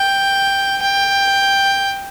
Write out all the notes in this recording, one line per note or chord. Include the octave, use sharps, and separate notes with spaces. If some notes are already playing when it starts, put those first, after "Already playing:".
Already playing: G5
G5